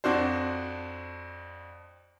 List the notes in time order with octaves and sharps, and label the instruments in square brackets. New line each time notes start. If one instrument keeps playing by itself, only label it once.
[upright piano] F2 D4 F#4 C5